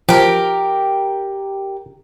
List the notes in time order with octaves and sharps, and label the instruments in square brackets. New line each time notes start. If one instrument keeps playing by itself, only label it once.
[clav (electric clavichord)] F3 [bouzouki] G4 A#4